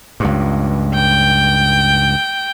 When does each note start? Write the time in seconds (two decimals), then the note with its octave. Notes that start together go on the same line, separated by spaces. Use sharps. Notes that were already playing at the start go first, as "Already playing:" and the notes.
0.20 C#2 G2
0.95 G5